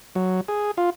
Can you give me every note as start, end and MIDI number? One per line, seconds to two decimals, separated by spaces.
0.15 0.41 54
0.48 0.71 68
0.77 0.90 65